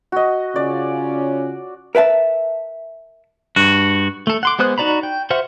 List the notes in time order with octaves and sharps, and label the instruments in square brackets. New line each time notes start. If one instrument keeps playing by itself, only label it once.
[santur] F#4 D#5
[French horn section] C#3 C#4 F4 [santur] D5
[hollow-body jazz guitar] A#4 B4 E5 A5
[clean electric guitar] G2 F#4
[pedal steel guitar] A3 A4
F#5 C6 D6
G#3 B3 C5 D#6 F#6
D#4 F#4 D5 A#5 B5
G5
F#4 C5 E5 F#5 F6